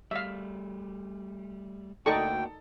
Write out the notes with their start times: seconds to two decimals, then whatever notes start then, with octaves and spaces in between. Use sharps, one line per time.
0.11 G3 A3 E5 F5
2.06 D2 A#3 D#4 F#4 A4 D5 G5 C#6